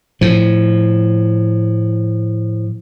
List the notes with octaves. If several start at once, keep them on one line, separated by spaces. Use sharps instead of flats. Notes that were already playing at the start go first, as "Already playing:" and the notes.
A2 F3